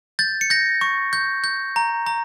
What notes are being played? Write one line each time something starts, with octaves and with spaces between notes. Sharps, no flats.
G6 A6
C#7
G6 A#6
C#6
G6
G6
A#5
A#5